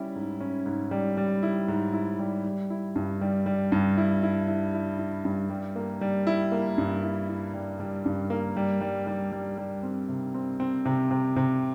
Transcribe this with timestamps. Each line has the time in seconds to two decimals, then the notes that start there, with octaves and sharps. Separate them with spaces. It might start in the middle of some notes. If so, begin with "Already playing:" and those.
Already playing: G3 C#4 E4
0.15 G#2
0.41 C#4
0.66 G#2
0.91 G3
1.17 G3
1.43 E4
1.68 G#2
1.93 E4
2.19 G3
2.44 G3
2.70 E4
2.96 G2
3.21 G3
3.46 G3
3.72 G2
3.98 E4
4.23 E4
4.48 E4
4.74 E4
4.99 E4
5.25 G2
5.50 G3
5.76 A#3
6.01 G3
6.27 E4
6.52 A#3
6.78 G2
7.04 E4
7.29 E4
7.54 G3
7.80 G3
8.06 G2
8.30 A#3
8.57 G3
8.81 G3
9.07 G3
9.32 G3
9.58 G3
9.83 C4
10.08 C3
10.34 C4
10.60 C4
10.85 C3
11.11 C3
11.36 C3